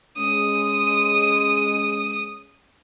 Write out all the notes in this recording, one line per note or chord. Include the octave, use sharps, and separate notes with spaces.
G#3 C#4 D#6